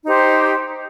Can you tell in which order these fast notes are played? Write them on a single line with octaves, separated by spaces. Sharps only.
D#4 G4 C5